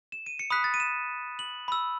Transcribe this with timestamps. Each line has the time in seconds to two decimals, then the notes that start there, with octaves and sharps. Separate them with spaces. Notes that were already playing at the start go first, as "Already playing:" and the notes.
0.12 E7
0.26 D#7
0.39 C#7
0.50 B5 D#6 F#6 B6
0.64 A6
0.74 D#7
0.80 E7
1.39 F#7
1.68 B5 E6